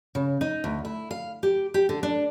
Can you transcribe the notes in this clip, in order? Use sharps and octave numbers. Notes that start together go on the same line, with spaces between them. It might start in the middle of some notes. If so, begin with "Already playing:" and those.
C#3
D#4
D2
E4
F5
G4
G4
D3
D4